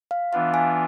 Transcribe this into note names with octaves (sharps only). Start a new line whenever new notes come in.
F5
E3 B3 D4 F4 F5
G#5